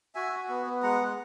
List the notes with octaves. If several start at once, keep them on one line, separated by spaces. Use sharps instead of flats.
F#4 E5 G#5
F#4
B3
B3
G#3 F#5 A#5
G#3